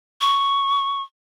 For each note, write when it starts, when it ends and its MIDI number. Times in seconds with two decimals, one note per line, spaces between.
0.21 1.02 85